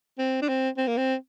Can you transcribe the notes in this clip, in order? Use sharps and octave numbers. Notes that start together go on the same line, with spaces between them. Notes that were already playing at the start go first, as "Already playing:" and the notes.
C4
D4
C4
C4
A#3
C4